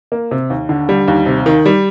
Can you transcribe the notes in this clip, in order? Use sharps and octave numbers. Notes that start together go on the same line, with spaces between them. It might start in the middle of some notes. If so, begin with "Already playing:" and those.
A#3
C3
D#2
D3
G3
D#2
C3
D#3
G3